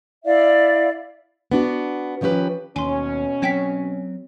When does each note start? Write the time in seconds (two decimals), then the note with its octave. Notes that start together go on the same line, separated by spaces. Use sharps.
0.25 E4 D5 E5 F5
1.52 B3 D4 F#4
2.21 D#3 F3 C#4 G4 B4
2.76 D#2 B2 C#4 G#5 C6
3.42 F#3 C4 C#5 G5 B6